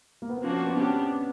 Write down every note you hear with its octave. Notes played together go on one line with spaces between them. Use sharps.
A#3
B3
C4
F3 A#3 C#4 D4 F#4
C4
B3
B3 C#4 D4 G4